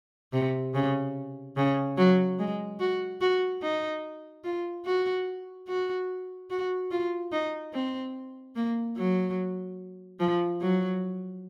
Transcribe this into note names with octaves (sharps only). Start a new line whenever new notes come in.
C3
C#3
C#3
F#3
G#3
F#4
F#4
D#4
F4
F#4
F#4
F#4
F4
D#4
C4
A#3
F#3
F3
F#3